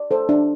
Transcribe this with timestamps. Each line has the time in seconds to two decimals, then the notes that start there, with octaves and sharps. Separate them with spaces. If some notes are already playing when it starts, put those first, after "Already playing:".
Already playing: D5
0.11 A4 C5
0.29 D4